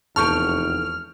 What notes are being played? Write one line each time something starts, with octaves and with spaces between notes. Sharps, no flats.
F1 E2 A4 A5 C#6 F6 G6 D7